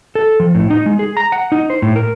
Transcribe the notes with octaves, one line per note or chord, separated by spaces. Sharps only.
A4
F3
A2
D#4
G#3
G#4
A#5
F#5
D#4
C5
A2
A#4